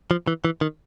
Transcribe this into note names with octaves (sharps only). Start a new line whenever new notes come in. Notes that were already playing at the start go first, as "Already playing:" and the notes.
F3
E3
E3
D#3